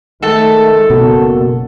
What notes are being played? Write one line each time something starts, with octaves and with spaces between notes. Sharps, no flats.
D#3 G#3 A3 A4 A5
F#1 B2 A#3 F#4